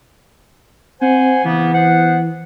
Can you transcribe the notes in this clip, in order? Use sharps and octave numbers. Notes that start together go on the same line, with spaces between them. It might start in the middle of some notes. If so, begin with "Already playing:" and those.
C4 C5 F#5 G#5
C#3 E3 A#3 B3
B3 C5 F#5